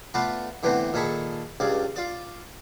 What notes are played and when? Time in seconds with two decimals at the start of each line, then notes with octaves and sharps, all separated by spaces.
0.14 A3 B3 F4 B4 D5
0.63 D3 E3 A3 B3 C4
0.93 A#2 D#3 G#4 A4 B5 C#6
1.60 C#2 G2 C#3 D5
1.96 F4 D5